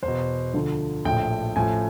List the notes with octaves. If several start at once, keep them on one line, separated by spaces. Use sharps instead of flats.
E2 C5
B2
D2 D3 F3
A#1 A2 F3 G5
A1 A2 F3 G#5